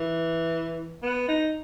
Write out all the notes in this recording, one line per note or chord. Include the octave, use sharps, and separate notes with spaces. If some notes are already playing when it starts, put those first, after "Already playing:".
Already playing: E3
B3
D#4